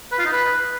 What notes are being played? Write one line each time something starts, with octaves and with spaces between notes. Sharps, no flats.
B4
F4
D#4
B4